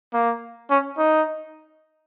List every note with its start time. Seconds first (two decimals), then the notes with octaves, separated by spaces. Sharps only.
0.14 A#3
0.70 C#4
0.98 D#4